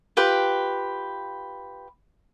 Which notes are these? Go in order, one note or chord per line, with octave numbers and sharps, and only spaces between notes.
F4 G4 B4 G5